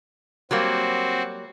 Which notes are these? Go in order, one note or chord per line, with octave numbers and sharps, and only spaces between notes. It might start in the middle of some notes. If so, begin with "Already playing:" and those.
F#3 G3 A#3 C4 F#4